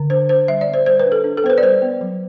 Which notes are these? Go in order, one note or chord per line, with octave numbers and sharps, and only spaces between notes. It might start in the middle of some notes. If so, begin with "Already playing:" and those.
Already playing: D3
D4 C5
D4 C5
G3 E5
D5
B3
C5
G3 C5
B4
D4
A4
D4
A4
B3 C5
B4
D5
G3 C5
B3
F#3